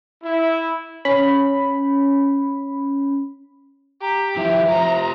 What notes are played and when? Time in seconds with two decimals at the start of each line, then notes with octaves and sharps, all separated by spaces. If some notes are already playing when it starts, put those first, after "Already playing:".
0.23 E4
1.05 C#4 B5
4.01 G4 A#5
4.37 F3 E4 E5
4.69 F4 G4 C5 A#5